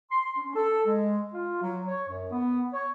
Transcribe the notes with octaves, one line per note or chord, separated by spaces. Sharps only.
C6
C#4
A4
G#3
F4
F#3
C#5
F#2
B3
C#5